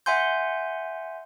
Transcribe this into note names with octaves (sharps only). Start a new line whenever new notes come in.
E5 F#5 G#5 C6 G6